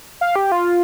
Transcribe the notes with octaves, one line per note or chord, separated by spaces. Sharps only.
F5
G4
F4